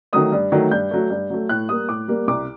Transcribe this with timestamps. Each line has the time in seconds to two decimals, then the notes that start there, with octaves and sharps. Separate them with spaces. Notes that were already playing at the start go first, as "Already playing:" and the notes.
0.13 D#3 F#3 A3 D#6
0.32 G2
0.52 D#3 F#3 A3
0.71 G2 G6
0.91 F#3 A3
1.10 G2
1.30 F#3 A3
1.49 A2 F#6
1.69 G3 A#3 D#6
1.88 A2 D6
2.08 G3 A#3
2.27 C2 D6